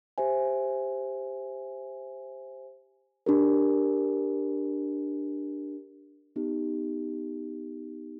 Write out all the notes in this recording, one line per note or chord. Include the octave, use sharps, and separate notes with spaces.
G4 C5 E5 G#5
D4 G4 A#4
B3 D#4 G4